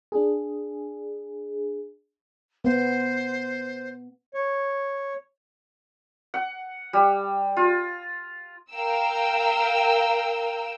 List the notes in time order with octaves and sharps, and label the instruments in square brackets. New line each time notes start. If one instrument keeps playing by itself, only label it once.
[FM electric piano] D4 G#4
[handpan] B3 [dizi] C5
[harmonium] C#5
[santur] F#5
G3
F4
[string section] A#4 F5 G5 E6